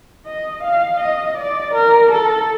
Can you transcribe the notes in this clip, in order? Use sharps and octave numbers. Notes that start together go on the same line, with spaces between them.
D#5
F5
D#5
D5
A#4
A4